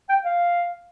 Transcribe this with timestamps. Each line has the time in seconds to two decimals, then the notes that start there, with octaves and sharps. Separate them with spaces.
0.09 G5
0.24 F5